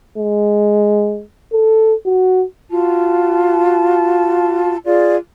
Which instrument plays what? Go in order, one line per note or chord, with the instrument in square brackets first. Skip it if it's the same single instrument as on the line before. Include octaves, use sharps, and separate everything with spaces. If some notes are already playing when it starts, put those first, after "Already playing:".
[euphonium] G#3
A4
F#4
[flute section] F4 F#4 A5
F4 G#4 D5